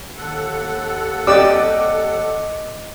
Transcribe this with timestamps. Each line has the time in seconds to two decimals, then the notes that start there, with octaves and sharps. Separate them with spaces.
0.17 D#2 A4 F#5
1.27 G4 D5 D#5 D6 E6